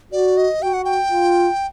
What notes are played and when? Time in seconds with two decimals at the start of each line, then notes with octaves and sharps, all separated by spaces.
0.12 F#4 D5
0.37 D#5
0.62 F#4 G5
0.73 F#5
0.84 G5
1.12 F4